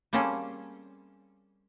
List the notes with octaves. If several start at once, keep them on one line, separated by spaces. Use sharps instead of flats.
G3 A#3 C4 C#4 G#4 A4